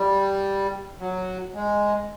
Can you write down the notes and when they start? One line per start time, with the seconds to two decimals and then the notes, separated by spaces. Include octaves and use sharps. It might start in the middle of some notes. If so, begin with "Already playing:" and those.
Already playing: G3
1.00 F#3
1.54 G#3